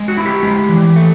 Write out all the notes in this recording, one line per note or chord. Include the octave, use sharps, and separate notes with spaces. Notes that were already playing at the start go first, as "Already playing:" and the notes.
Already playing: G#3
F#4
E4
G4
G#3
E3
A3